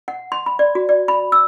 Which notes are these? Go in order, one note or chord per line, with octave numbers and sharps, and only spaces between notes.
F#5
C6
B5
D5
F#4
D5
B5
E6